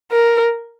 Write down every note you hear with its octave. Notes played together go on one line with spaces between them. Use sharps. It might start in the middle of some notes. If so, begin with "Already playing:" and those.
A#4